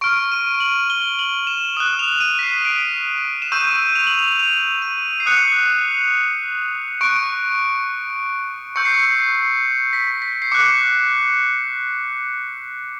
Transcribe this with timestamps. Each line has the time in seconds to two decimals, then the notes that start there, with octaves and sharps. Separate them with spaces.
0.01 C#6 F6 D7
0.32 D#7
0.60 F#7
0.90 G7
1.19 F#7
1.47 E7
1.76 D#6 F#6 E7
1.99 F7
2.20 D#7
2.39 B6
2.43 C7
2.65 D7
3.42 E7
3.52 C#6 E6 G6 D#7
3.95 F7
4.07 F#7
4.19 F7
4.39 F7
4.82 D#7
5.20 C7
5.26 D#6 F#6 C#7
7.01 C#6 F#6 D7
8.76 C#6 E6 G6 C#7
8.85 C7
8.94 C#7
9.20 C7
9.93 B6
10.22 B6
10.42 C7
10.51 D6 F#6 C#7